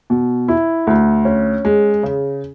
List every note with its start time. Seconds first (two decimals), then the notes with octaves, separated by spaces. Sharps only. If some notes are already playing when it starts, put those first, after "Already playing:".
0.10 B2
0.48 E4
0.87 D2
1.25 C#4
1.65 G#3
2.03 C#3